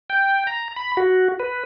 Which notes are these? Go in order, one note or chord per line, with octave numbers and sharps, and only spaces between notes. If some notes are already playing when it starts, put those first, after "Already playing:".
G5
A#5
B5
F#4
B4